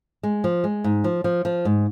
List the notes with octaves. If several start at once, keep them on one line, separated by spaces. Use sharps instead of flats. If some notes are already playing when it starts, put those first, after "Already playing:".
G#3
F3
G#3
G#2
F3
F3
F3
G#2